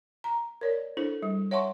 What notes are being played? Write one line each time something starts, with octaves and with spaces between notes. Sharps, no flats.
A#5
A#4 C#5 D5
D4 E4 A4 C5
G3
C#5 E5 F#5 A5 C6 C#6